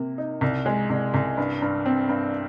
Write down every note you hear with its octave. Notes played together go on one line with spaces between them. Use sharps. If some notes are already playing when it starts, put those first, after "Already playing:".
Already playing: C3 A#3
D#4
C2
G#3
C2
C2
G2
G2
C4
G2